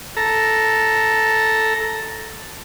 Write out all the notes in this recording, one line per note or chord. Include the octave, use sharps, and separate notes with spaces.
A4 A#5